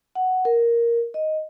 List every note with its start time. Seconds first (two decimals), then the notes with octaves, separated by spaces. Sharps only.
0.15 F#5
0.45 A#4
1.14 D#5